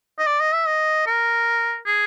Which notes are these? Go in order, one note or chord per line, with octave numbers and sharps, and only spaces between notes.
D#5
D5
D#5
E5
D#5
A#4
G#4